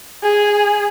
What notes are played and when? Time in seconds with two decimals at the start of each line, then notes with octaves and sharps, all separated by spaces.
0.23 G#4